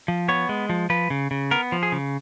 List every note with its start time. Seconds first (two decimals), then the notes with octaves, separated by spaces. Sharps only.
0.08 F3
0.28 B3 C#5
0.49 G#3
0.69 F3
0.90 F3 B4
1.10 C#3
1.31 C#3
1.51 B3 A#4
1.72 F3
1.83 G#4
1.92 C#3